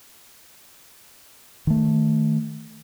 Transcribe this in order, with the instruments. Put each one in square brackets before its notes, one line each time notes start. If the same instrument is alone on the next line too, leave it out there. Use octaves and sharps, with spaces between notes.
[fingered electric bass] D#3 A3